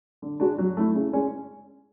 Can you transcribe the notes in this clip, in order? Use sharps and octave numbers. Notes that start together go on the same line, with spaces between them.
D3
G#3 D4 F#4
F#3
A3 E4
C#3
G#3 C#4